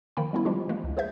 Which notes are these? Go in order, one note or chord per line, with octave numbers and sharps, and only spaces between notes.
D#3 F3 A#3 G5 B5
G3 B3 C#4 E4
F3 G3 G#3 D4 F4 G4
E3 G#3 A#3
C#2
G#4 B4 C5 E5 G6